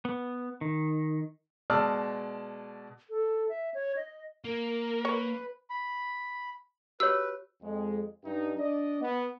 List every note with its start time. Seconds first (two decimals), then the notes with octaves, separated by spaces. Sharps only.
0.05 B3
0.61 D#3
1.70 B2 G#3 D5 A5 E6 F6
3.10 A4
3.49 E5
3.74 C#5
3.96 D#5
4.45 A#3 A#4
5.05 B4 C#5
5.70 B5
7.00 F#4 G4 B4 C#5 E6
7.62 F2 G#3
8.25 G2 G3 D#4
8.58 D4 D5 D#5
9.02 B3